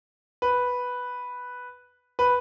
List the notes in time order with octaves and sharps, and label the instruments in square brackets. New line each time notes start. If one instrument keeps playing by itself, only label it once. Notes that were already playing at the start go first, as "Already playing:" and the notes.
[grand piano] B4
B4